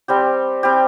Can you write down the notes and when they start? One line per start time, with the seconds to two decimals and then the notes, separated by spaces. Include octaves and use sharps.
0.08 G3 C4 G4
0.63 G3 C4 G4